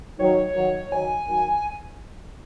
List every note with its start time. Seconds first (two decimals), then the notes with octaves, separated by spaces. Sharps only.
0.19 D#3 F#3 C#5
0.55 D#3 F#3
0.91 D#3 F#3 G#5
1.27 D#3 F#3